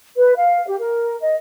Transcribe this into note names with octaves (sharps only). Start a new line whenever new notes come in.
B4
F5
G4
A#4
D#5